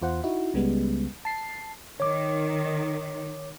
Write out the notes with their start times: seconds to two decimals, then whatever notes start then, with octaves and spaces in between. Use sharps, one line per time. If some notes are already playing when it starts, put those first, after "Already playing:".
0.02 E2 F4 C5 F#5
0.24 D#4 E4 F#4
0.54 C#2 C#3 G3 G#3 B3
1.25 A5 C7
2.00 D#3 C#5 D6